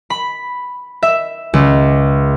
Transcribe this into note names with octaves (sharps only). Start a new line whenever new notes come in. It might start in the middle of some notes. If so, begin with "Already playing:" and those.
B5
E5
C#2